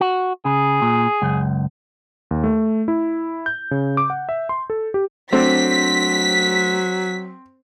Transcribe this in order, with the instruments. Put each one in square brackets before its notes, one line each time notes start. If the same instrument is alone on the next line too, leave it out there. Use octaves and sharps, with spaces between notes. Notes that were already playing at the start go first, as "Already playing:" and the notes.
[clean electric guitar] F#4
[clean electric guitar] C#3 [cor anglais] G#4
[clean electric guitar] A#2
C#2 F#2
[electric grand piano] D#2
A3
E4
G6
C#3
D6
F#5
E5
C6
A4
G4
[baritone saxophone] F#3 [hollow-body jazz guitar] A3 D4 [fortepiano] C4 [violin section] B6